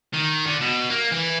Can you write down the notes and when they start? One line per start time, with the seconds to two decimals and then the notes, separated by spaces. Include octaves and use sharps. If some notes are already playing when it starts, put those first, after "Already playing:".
0.14 D#3
0.46 D3
0.61 B2
0.90 A#3
1.11 E3